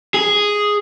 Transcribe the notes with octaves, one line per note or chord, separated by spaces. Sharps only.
G#4